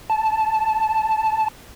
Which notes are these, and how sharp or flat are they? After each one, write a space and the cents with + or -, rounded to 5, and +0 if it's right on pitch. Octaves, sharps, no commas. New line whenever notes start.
A5 -10